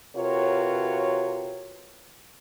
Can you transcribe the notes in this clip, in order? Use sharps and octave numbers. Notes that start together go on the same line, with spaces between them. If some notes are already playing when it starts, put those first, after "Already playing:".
C3 F4 F#4 A#4 B4 C#5